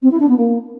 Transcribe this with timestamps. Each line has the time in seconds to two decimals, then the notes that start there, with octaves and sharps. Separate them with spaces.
0.02 C4
0.10 E4
0.19 D4
0.28 B3
0.37 A#3